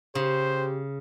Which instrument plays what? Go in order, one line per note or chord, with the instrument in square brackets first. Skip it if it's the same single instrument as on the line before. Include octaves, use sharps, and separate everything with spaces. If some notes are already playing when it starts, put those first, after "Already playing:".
[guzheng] C#3 [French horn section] G4 [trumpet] C5